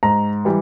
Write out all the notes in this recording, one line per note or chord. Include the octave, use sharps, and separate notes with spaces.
G#2 A#5
E3 G3